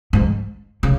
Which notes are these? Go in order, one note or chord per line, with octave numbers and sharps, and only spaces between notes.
G#2
C#3